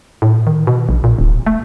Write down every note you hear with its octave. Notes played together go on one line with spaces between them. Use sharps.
A2
D#3
B2
A#1
A#2
D1
A3